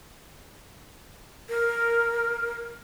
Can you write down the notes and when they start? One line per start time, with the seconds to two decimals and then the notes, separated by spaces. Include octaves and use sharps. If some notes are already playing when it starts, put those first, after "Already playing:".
1.49 A#4